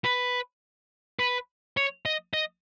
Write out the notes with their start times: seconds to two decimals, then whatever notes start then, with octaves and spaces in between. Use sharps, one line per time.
0.04 B4
1.19 B4
1.77 C#5
2.06 D#5
2.34 D#5